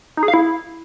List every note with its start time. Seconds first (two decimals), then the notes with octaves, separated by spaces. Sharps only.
0.17 D#4
0.23 G#4
0.28 F5
0.34 E4